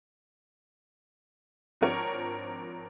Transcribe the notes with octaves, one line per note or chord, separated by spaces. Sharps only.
G#1 F3 C4 D4 A#4 C#5